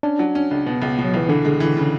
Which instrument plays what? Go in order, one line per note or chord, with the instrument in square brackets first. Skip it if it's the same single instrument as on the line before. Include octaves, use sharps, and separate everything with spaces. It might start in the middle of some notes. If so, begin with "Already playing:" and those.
[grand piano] C#4 [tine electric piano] D4
[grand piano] F#3
C#4
C#2
[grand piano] B2 [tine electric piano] B3
[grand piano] C#2
B2
[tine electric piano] F#3
[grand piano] C#2 [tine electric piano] E3
[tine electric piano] D3 [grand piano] E3
[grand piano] G#3
E3
C#3